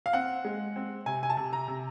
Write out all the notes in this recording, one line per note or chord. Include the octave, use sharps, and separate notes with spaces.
F5
C4 F#5
G#3
C4
C3 G#5
G#5
A5
C3
A#5
C3